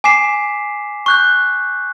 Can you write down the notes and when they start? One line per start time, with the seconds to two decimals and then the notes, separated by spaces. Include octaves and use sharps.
0.04 G#5 D6 B6 C7 E7
1.06 C#6 F#6 G6